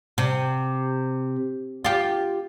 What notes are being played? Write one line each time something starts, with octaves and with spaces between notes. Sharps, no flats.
C3
F4 G4